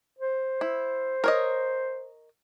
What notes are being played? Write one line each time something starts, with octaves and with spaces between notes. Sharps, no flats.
C5
E4
A#4 C#5 D#5